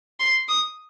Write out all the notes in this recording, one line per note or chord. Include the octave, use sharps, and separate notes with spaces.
C6
D#6